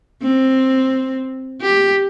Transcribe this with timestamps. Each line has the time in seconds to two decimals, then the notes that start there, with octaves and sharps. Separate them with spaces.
0.22 C4
1.62 G4